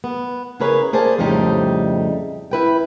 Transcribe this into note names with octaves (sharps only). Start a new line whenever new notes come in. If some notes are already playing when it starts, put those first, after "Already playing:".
B3
C#3 E4 G#4 A#4 B4 C#5
A#3 G#4 C5 D5 A5
F2 A2 C#3 G3 D#4 C5
E4 B4 G5